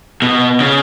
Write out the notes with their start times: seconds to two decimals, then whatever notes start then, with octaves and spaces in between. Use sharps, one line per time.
0.22 B2
0.60 C#3